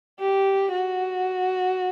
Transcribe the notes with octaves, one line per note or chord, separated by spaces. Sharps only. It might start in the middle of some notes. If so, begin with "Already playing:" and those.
G4
F#4